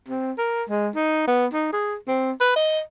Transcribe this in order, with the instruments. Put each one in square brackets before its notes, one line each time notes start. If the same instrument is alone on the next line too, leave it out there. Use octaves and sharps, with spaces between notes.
[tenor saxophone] C4
A#4
G#3
D#4
B3
D#4
G#4
C4
B4
D#5